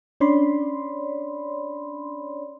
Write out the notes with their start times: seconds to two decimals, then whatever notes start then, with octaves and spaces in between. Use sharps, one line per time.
0.20 C#4 D4 C#5 D5 B5 C6